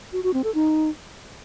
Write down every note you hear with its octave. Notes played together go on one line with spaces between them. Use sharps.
F#4
F#4
C4
A4
D#4